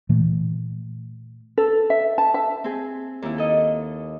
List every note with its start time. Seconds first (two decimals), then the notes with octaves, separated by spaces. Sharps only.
0.09 A#2 E3 A3
1.58 A4
1.90 E5
2.18 A5
2.34 E5
2.64 C4 G#4
3.22 D#2 E4
3.38 A4 D#5